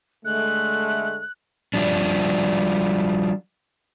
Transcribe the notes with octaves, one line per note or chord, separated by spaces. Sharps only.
D3 G#3 A3 F#6
F3 G3 D4